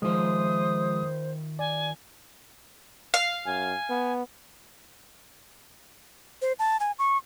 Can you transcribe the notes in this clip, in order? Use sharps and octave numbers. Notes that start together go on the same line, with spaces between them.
D#3 F3 G#3 F4 C5 D#6
D5 G#5
F5
F#2 G#5
B3
C5
A5
G#5
C#6